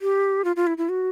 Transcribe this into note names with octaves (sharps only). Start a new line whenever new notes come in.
G4
F4
F4
E4
E4
F#4